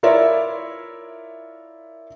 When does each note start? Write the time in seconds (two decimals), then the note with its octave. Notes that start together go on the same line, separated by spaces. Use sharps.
0.03 E4 F4 A#4 C#5 D5 E5